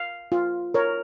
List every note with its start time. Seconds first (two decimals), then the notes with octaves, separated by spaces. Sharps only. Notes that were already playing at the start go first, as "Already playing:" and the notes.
Already playing: F5
0.32 F4
0.74 A#4 C#5